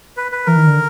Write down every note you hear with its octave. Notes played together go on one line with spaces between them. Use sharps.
B4
B4
E3 A#4
D#3
D3